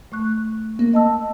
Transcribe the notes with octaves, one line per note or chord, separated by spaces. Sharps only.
A3 C#6 F#6
A#3
D#5 A5 E6